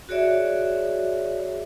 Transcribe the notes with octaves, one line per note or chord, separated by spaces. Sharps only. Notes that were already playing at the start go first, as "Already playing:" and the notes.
F#4 G#4 C#5 D5 E5